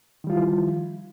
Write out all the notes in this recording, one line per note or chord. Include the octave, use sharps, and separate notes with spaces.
D#3 F3 G3 E4 F4